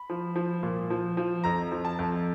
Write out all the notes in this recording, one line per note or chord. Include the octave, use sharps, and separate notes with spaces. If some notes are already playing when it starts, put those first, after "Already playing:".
Already playing: B5
F3
F3
A#2
F3
F3
F2 A#5
F3
A5
F2